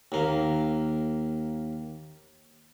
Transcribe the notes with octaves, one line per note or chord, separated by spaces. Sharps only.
D#2 A#3